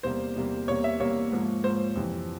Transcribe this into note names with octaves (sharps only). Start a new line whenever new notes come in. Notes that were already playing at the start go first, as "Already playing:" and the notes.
E2 C3 G3 A#3 C5
E2 C3 G3 A#3
E2 C3 G3 A#3 C#5
E5
E2 C3 G3 A#3 C#5
G#2 F3 A#3
G#2 F3 A#3 C5
F2 C3 E3